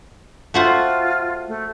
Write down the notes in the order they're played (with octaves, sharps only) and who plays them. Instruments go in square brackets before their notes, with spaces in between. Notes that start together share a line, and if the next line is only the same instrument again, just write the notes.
[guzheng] A3 F#4 C5 [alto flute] F4
[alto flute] A3